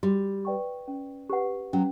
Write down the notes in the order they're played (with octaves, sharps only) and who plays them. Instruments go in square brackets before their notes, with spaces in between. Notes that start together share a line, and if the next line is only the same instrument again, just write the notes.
[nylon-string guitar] G3 [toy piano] F#4
[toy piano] B4 D5 G5 C#6
C#4
G4 B4 F#5
[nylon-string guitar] F#3 [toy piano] C#4